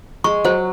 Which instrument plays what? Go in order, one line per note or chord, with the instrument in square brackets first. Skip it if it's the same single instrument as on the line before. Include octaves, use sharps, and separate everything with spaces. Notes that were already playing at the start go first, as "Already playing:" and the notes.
[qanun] G#3 [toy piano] C#6
[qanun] F#3 [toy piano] C5